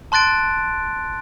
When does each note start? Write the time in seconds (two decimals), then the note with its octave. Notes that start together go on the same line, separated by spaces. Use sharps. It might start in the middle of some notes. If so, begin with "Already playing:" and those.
0.12 A5 C6 F#6 A6 D7